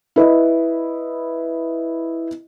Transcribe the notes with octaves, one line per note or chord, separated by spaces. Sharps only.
E4 B4 D#5